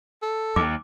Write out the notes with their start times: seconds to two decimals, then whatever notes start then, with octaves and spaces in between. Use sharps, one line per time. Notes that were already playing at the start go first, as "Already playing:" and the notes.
0.23 A4
0.56 D#2 D6